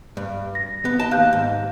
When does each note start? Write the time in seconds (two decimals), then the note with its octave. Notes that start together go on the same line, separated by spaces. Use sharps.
0.17 G2
0.55 A#6
0.85 B3
0.99 D#5 A5
1.11 D#2 F5 F#6 G6
1.33 G#2